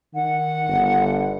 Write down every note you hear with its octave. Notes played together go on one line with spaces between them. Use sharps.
D#3 F#5
G1